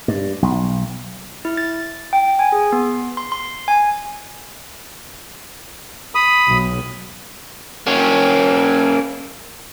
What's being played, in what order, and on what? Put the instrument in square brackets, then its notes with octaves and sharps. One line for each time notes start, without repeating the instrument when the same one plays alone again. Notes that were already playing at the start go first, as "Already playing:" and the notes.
[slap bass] G2
B1
[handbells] E4
A6
G5
G#5
G#4
B3
C6
C6
G#5
[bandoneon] B5 D#6
[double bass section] B1
[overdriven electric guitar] A#3 C#4